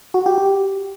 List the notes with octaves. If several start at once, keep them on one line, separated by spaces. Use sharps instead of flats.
F#4
G4
G4